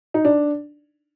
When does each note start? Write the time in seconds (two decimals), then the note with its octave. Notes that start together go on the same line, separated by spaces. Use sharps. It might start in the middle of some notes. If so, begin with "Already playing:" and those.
0.14 D#4
0.25 D4